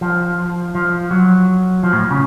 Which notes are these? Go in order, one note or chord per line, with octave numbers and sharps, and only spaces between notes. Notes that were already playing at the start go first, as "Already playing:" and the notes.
F3
F3
F#3
F3
A2
C#3